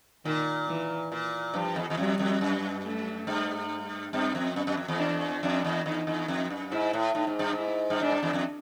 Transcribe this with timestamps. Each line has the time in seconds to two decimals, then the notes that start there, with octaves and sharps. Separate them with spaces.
0.25 A#2 D#3
0.68 E3
1.12 A#2
1.54 G2 F3
1.76 E2
1.90 E2
1.97 F2 G3
2.19 F2
2.41 F#2
2.84 A3
3.27 G2
4.13 G2 C4
4.35 F2
4.56 F#2
4.67 F#2
4.77 F2
4.88 E2
4.99 D4
5.43 F2 D4
5.64 E2
5.85 E2 D#4
6.07 E2
6.28 F2
6.50 F#2
6.71 G#2 E4
6.93 A2
7.14 A2 D#4
7.27 G#2
7.39 G2
7.52 G#2 E4
7.90 G2
8.01 G#2 D4
8.12 G2
8.23 E2
8.33 F2